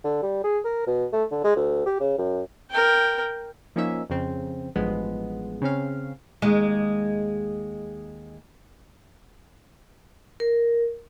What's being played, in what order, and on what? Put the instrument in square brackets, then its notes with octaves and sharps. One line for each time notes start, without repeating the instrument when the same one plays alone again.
[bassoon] D3
G3
G#4
A#4
B2
A3
D3
G#3
D2
G4
C#3
F#2
[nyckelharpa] A#4 G5
[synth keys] F3 A#3 C#4 D#4 E5
F2 C#3 C4
A1 G2 F3 G#3 B3
C#3 C4 C#4 F5
[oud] D#2 G#3
[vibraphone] A#4